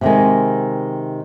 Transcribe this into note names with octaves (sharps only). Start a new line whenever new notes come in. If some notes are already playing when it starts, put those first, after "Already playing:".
C3 D#3 G#3